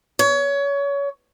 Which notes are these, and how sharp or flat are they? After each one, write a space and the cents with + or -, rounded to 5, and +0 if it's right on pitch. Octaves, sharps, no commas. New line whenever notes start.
C#5 +25